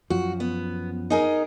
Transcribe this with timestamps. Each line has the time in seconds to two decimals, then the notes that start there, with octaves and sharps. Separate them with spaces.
0.10 F#2 F3 F#4
0.40 B3
1.10 D#4 G#4 A#4